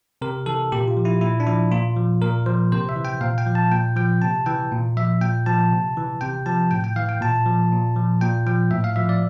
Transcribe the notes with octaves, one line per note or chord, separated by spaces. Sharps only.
C3 A#4
E3 A4
A#2 G4
F4
F3
E4
A#2 E4
D4
F3 E4
A#2 F4
F3
A#2 A#4
F3 C5
C3 C5
E5
E3
G5
A#2 F5
G5
F3
A5
A#2 G5
F3 G5
C3 A5
E3 G5
A#2
F3 E5
A#2 G5
F3 A5
C3
E3
C3 G5
F3 A5
A2 G5
G5
E3 F5
G5
A#2 A5
F3
A#2
F3
A#2 G5
F3 G5
A2 E5
F5
F3 E5
D5